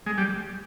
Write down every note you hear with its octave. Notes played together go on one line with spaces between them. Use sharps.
G#3
G3